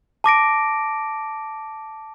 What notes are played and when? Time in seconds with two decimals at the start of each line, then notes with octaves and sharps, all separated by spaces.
0.24 A5 D6 A#6 D7